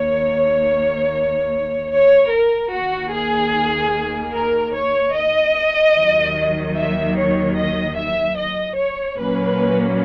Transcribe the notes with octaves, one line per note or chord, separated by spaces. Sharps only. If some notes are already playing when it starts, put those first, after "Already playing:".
Already playing: D#2 D#3 A#3 C#5
C#5
A#4
D#2 D#3 A#3 F#4
G#4
A#4
C#5
D#5
D#2 D#3 F#3
E5
C#5
D#5
E5
D#5
C#5
A#2 F#3 A#3 C#4 B4